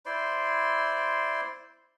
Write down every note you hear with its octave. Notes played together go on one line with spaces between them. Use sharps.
E4 C5 D5 C6